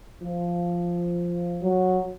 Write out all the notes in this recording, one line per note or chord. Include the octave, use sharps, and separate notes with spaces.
F3
F#3